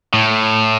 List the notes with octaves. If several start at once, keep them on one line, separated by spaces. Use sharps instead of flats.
A2